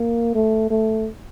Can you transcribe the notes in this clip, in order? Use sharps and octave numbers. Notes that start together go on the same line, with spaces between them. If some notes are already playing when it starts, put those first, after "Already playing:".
Already playing: A#3
A3
A3